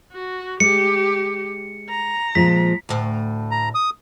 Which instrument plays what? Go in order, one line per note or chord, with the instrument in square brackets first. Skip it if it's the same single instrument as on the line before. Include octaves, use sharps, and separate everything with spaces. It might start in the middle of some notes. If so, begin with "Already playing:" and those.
[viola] F#4
[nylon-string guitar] G#3 [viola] G4 [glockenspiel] C#7
[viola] A#5
[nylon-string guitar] A#2 F3 G#3 [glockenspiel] B6
[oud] D2 A2
[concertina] A#5
D#6